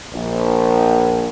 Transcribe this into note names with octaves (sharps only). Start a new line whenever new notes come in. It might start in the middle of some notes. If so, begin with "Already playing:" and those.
A#1